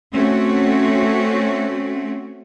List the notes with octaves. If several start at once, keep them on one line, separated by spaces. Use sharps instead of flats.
A3 C4 C#4 F#4